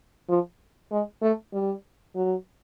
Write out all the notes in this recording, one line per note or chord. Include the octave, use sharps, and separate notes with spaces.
F3
G#3
A3
G3
F#3